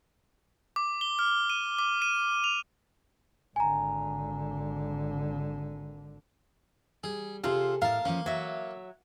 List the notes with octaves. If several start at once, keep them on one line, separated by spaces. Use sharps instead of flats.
D6
G7
F6
D#7
D6
D#7
F7
G#1 D3 G#5 A#5
G3 G#4
C3 F4 G#4 A4
A2 A#4 F5 A5
F3 A#3 C#4
F#3 C#5 E5